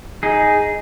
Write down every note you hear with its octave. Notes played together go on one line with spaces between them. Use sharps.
D#4 G#4